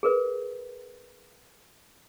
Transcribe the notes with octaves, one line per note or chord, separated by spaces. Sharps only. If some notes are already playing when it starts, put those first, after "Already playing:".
G#4 A#4 B4